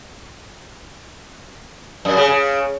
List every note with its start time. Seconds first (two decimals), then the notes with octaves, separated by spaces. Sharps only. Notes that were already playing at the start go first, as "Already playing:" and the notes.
2.05 F#2
2.17 C#3
2.29 C#3